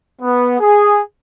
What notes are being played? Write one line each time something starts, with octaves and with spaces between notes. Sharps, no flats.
B3
G#4